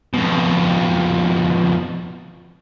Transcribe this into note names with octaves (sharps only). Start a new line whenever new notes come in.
F2 B2